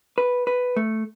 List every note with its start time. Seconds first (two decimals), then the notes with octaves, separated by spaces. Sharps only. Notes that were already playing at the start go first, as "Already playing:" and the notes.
0.18 B4
0.47 B4
0.76 A3